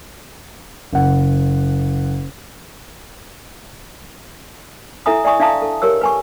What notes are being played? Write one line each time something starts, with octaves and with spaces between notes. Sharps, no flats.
F#1 F#5
E4 A4 E5 G#5 A#5 D#6
D5 E5 G#5 C#6 D#6
D4 E5 F5 A5 A#5 D#6
A4
G4 A#4 C#5 E6
B4 G#5 C#6